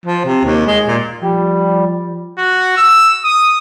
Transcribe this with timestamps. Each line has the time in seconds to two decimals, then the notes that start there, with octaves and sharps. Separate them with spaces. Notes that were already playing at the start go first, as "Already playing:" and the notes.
0.06 F3
0.25 C3
0.44 D#2
0.67 G#3
0.87 A#2
1.22 F3 G3
2.38 F#4
2.77 E6
3.24 D#6